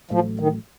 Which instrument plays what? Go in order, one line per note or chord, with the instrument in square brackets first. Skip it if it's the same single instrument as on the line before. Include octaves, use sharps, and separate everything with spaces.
[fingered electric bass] A1 A2 F#3 A3 [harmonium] F3
[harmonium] D#3